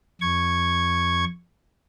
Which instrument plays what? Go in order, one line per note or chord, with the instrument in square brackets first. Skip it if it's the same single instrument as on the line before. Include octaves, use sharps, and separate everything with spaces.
[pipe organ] F2 C#6 G#6